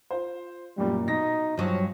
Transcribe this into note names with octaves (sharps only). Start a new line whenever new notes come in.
F4 C5
F#2 A#2 G3 A#3
B2 D#4 A#6
G2 F3 F#3 C#4